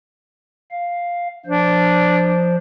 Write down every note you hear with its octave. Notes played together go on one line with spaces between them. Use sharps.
F5
F3 D4 C5